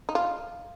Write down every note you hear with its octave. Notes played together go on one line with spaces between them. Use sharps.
D#4
F4